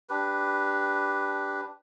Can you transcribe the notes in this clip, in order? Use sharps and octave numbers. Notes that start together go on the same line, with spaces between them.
D4 G4 B4